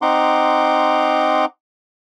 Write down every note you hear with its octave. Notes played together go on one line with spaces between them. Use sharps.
C4 D#4 F#5 A#5 C6 D6